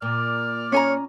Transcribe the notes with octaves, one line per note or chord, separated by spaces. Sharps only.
A#2 D5 F6
C#4 C#5 G#5 A#5